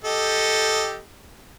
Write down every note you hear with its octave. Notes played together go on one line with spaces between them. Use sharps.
G4 A4 D#5